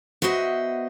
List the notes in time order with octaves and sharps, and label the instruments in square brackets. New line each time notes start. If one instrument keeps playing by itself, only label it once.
[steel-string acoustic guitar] B3 F#4 C5 D#5 E5